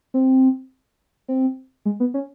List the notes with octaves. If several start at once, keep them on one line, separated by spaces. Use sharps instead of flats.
C4
C4
G#3
B3
C#4